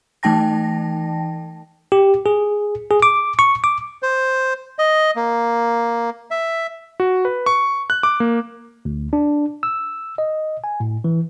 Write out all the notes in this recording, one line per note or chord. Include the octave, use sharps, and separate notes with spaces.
E3 A3 D#4 G5 A5 A#6
G4
G#4
G#4
D6
C#6
D6
C5
D#5
A#3
E5
F#4
B4
C#6
F#6
D6
A#3
D2
D4
E6
D#5
G#5
A2
E3